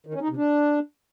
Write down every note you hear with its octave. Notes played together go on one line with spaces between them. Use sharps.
D#3
C#4
D#4
C3
D4